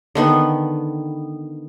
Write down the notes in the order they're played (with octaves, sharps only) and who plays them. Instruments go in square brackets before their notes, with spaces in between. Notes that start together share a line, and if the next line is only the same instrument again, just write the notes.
[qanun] D3 D#3 B3